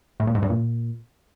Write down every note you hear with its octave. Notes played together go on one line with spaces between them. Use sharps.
A2
A#2
G#2
G2
A#2